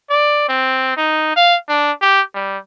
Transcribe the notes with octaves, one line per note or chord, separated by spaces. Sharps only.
D5
C4
D#4
F5
D4
G4
G3